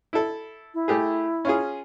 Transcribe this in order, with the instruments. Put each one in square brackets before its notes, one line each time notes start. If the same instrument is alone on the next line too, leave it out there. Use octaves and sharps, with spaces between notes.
[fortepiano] E4 A4
[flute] E4
[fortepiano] A3 G4 G#4
C#4 F4 G#4